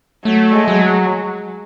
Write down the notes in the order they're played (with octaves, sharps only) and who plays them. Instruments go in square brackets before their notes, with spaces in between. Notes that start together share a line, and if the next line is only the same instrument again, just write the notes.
[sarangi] F#3 [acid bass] A3
[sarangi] G#3
[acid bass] F#3